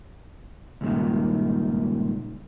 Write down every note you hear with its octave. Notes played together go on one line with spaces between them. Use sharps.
C#2 G2 A#2 D#3